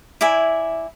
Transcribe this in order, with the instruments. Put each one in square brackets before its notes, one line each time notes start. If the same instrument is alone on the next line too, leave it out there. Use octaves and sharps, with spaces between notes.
[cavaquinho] E4 D5 E5 G#5